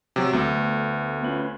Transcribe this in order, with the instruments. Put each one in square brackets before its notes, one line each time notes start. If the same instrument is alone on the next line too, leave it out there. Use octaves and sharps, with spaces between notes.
[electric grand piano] C3 F#3
[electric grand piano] D2 [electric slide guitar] A3 B3
[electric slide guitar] C#4 F4 B4